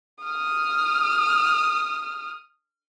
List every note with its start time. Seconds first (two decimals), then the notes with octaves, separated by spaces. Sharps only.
0.24 D#6 F6